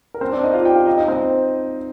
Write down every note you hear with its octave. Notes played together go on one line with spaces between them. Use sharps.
A#4
C4 C5
D4 D5
D#4 D#5
F4 F5
G4 G5
F4 F5
D#4 D#5
D#4 D#5
C4 C5